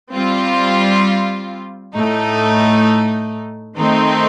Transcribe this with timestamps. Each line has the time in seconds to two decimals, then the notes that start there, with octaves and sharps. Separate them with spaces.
0.12 G3 C4 F4
1.94 A2 A3 D#4
3.76 D#3 A3 C4 D#4